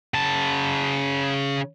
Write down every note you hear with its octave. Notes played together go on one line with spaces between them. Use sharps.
C#3 A5